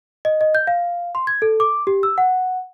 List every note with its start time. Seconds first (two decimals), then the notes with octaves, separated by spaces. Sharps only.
0.25 D#5
0.41 D#5
0.55 G6
0.67 F5
1.15 C6
1.27 G#6
1.42 A4
1.60 D6
1.87 G4
2.03 E6
2.18 F#5